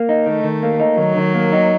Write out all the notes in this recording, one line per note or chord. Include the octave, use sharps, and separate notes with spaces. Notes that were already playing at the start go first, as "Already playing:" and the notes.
Already playing: A#3
D#4
D#3 A3
D#3
A#3
D#4
D#3 F#3
D#3
A#3
D#4